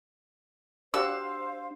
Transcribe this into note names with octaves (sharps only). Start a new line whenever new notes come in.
D4 F#4 G4 C5 F5 F#5 E6